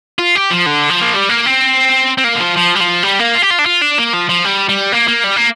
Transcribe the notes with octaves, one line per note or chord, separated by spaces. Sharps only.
F4
G4
F3
D3
F3
A#3
G3
A#3
C4
C4
A#3
D3
F3
F3
G3
F3
G3
A#3
F4
G4
F4
D4
F4
D4
A#3
F3
F3
G3
G3
A#3
A#3
G3
A#3